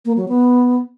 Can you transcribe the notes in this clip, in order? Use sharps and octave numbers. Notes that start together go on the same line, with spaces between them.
A#3
F#3
B3